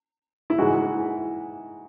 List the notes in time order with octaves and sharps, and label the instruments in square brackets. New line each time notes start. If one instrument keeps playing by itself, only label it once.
[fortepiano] E4
G#2 E3 G#3 F#4